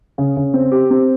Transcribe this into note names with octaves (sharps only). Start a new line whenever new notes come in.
C#3
C#3
C4
G4
C4